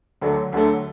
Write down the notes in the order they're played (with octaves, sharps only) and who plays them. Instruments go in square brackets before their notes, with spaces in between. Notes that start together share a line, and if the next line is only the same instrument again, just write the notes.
[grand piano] D2 D3 F#3 A3
D2 D3 F#3 A3